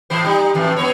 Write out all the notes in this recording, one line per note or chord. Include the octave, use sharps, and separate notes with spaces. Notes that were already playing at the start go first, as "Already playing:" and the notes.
A2 E3 C5
G3 D#4
F2 A2 E3
F#2 B3 C#5